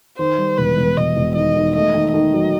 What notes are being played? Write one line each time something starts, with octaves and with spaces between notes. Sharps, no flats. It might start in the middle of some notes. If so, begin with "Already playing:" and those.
D#3 C5
G3
E1 B4
E1
E1 D#5
E1
D#3 D#5
D#3
A3 D#5
D#3
D#3 D#5
F#3